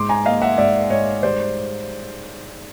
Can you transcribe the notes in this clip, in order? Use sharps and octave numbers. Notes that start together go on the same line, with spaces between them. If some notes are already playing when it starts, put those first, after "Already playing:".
Already playing: G#2 C6 D6
G#5 A#5
A#3 D#5 F5
E5 F#5
G#2 D5 E5
G#2 C#5 D#5
G3 C5 D5